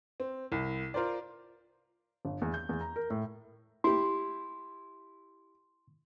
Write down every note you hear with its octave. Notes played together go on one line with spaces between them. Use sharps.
C4
C2
F4 A#4 C5 D5
G1
E2
G6
E2
A#5
A#4
A2
E4 G4 C6